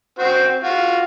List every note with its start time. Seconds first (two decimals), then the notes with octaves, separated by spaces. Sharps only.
0.19 C4 F#4 C5
0.64 F4 F#4